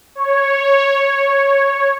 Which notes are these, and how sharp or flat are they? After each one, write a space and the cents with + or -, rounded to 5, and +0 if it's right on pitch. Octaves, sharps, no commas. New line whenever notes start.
C#5 -5